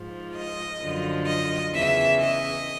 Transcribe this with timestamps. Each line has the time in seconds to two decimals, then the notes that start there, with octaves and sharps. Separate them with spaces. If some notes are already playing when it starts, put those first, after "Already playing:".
Already playing: G#2 F3
0.37 D#5
0.82 F#2 D3 F3
1.27 D#5
1.73 E2 C#3 E3 E5
2.20 D#5